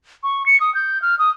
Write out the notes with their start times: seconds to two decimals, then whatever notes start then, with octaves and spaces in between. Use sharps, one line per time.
0.23 C#6
0.46 C#7
0.60 D#6
0.75 G6
1.02 F6
1.19 D#6